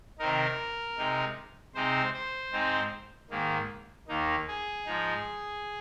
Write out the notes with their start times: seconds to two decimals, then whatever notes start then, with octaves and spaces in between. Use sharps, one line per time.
0.19 C3 D#3 C4 D#4 A#4
0.97 C3 G#3 D#4
1.74 C3 G#3 C4 D#4 C5
2.14 C5
2.52 G#2 G#3 C4 D#4
3.30 G#2 D#3 A#3
4.08 D#2 D#3 A#3 D#4
4.47 G#4
4.86 G#2 F3 G#3 D#4